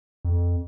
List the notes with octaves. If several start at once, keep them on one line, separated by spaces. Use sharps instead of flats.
F2